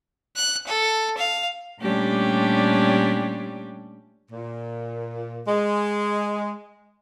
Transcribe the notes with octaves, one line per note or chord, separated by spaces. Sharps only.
F#6
A4
F5
A#2 G3 A3 C#4 D4 G4
A#2
G#3